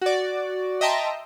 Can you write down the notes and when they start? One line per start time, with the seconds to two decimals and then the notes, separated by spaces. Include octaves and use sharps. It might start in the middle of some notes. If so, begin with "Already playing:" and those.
0.01 F#4 D5
0.81 D#5 E5 G5 A5 A#5 C6